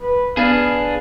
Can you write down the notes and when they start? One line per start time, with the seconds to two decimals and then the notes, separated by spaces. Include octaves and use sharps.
0.02 B4
0.37 B3 D4 G#4 F5